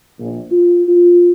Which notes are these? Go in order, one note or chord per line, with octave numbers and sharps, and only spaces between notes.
A#1
F4
F4